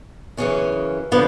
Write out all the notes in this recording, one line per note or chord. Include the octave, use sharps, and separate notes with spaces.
F#2 C#3 E3 C#4
D3 F3 B3